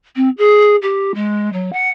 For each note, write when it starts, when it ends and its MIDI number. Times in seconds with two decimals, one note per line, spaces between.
0.15 0.29 60
0.37 0.75 68
0.82 1.12 67
1.14 1.51 56
1.52 1.70 54
1.72 1.89 78